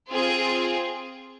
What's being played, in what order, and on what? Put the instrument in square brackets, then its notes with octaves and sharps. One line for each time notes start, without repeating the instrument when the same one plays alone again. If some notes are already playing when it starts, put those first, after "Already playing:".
[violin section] C4 F4 G#4